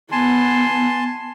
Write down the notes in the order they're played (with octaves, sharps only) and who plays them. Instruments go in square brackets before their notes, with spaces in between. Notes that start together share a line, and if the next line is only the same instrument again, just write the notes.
[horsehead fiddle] B3 [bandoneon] G#5 A5 C6